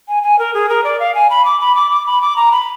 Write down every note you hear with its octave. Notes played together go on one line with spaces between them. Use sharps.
G#5
G#5
A#4
G#4
A#4
D5
F5
G#5
B5
D6
B5
D6
D6
B5
D6
A#5
B5